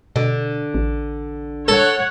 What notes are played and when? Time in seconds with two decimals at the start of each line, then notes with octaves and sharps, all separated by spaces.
0.16 B2 D3
0.74 A1
1.68 A4 C#5 F#5